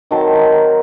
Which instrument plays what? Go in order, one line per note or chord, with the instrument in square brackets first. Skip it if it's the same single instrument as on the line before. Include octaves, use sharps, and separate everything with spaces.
[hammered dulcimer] D#3 F#3 C4 A5 C6